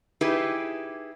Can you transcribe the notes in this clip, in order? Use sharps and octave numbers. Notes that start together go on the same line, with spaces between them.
D#4 E4 G4 G#4 B4